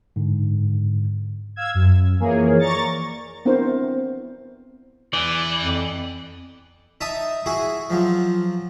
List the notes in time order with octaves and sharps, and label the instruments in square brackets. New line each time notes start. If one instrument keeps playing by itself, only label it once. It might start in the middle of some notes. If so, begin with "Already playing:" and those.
[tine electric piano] G#2 D3
[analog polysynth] F5 E6 G#6
F#2
E3 F3 A#3 G#4 A#4 C#5
D5 A#5 C#6 A6
[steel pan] B3 C4 D4 E4 A#4 C5
[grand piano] E2 [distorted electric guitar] E3 [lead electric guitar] D5
[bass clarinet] F2
[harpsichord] D#4 E5 A5 D#6
E4 F#4 G#4
F3 F#3